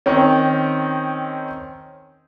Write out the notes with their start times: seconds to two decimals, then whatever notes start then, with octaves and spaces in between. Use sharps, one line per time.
0.06 D#3 C4 C#4